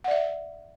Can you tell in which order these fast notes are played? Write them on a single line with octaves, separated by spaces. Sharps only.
F#5 D5 E5